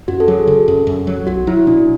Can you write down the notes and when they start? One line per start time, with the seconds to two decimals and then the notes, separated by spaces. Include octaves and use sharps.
0.08 F#2 F#4
0.20 A4
0.28 F#3 G#4
0.47 C#3 A4
0.68 F#2
0.87 F#2
1.07 F#3
1.27 B1 F#4
1.47 F#3 E4
1.66 B2 D4